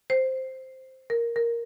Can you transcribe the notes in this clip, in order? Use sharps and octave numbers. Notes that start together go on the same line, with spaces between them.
C5
A#4
A#4